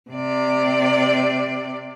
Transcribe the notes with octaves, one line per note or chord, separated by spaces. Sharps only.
C3 D5